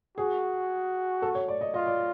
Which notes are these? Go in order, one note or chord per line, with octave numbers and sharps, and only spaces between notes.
F#4 G#4
A4
C#5
D5
D#5
F4 D#5
D5